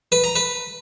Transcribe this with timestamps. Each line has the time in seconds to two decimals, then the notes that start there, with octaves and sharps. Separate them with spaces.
0.12 B4
0.24 A#5
0.35 B4